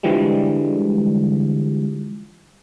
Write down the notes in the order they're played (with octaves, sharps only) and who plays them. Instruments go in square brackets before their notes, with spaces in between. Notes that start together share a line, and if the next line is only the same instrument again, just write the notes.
[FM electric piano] D3 E3 F3 G3 G#3